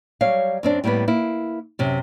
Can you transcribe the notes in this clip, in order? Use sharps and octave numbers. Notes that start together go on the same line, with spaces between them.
F#3 G3 C#5 F5
F#2 C4 D4
A2 G3 A#3 B3 B4
A#3 E4
F#2 C3